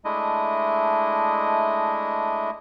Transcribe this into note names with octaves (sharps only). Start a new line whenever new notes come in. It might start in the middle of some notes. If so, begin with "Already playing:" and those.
G#3 A3 D4 E4 D#5